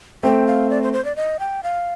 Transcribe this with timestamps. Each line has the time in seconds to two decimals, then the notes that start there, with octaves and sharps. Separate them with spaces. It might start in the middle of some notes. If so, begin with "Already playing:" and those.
0.23 A3 C4 G5
0.47 F5
0.70 D5
0.82 C5
0.93 C5
1.05 D5
1.16 D#5
1.40 G5
1.63 F5